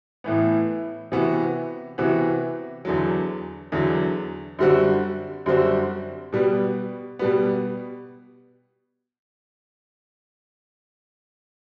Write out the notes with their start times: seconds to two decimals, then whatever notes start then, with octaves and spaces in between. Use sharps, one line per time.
0.24 A2 E3 B3
1.12 C3 E3 B3 F#4
1.98 C3 E3 B3 F#4
2.85 E2 D3 F#3
3.72 E2 D3 F#3
4.59 F#2 D3 G3 C4 F#4
5.46 F#2 D3 G3 C4 F#4
6.32 B2 G3 B3
7.19 B2 G3 B3